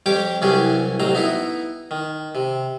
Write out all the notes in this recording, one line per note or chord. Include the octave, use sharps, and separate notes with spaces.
F2 G3 G4 C#5 G5 D6
C2 E3 F#3 C#4 G4 G#4
A1 C3 F#3 C5 A#5
B3 D#4 E4
D#3
C3